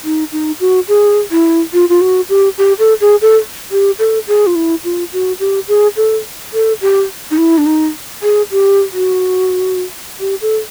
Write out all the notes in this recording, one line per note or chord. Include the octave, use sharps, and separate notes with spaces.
D#4
D#4
F#4
G#4
E4
F4
F4
F#4
G4
G4
A4
G#4
A4
G4
A4
G#4
F4
E4
F4
F#4
G4
G#4
A4
A4
G4
D#4
E4
D4
D#4
G#4
G4
F#4
G4
A4